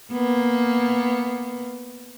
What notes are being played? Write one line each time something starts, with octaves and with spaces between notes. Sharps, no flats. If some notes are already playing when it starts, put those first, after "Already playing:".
A#3 B3